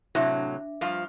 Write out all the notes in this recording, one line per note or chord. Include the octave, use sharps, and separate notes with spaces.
A2 C3 F#3 D4 E5 D6
G2 F3 F4